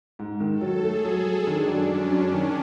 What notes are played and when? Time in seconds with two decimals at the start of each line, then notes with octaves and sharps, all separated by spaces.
0.19 G#2
0.40 D#3
0.51 A4
0.61 F#3
0.84 A3 G#4
1.05 F#3
1.26 F#3
1.47 D#3 D4
1.68 F#2
1.78 C#4
1.89 F#2
2.11 F#2 C#4
2.32 D#3